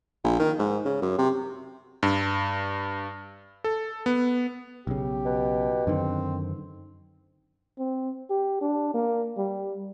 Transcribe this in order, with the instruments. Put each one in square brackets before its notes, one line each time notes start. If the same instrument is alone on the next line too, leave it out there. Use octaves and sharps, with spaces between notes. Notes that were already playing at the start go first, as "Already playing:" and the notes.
[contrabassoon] A#1
D#3
G#2
C#3
F#2
C3
[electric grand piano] G2
A4
B3
[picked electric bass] B1 C#3 [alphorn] G4
[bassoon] B2
[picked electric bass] F#2 D3 D#3 [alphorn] C4
[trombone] C4
G4
D4
A#3
G3